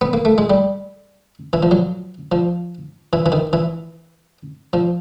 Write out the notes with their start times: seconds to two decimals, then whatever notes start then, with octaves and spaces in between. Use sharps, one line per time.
0.01 B3
0.13 A#3
0.25 A3
0.38 G#3
0.50 G3
1.53 E3
1.63 F3
1.71 F#3
2.32 F3
3.13 E3
3.26 E3
3.32 D#3
3.53 E3
4.73 F3